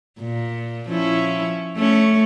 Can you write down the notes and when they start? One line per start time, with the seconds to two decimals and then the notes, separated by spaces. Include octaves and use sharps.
0.19 A#2
0.89 F3 C#4 E4
1.76 A3 C#4